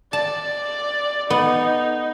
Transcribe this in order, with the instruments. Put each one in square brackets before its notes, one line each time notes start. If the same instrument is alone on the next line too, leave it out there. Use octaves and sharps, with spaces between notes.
[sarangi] D5 [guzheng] A5
[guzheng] B3 [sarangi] D#4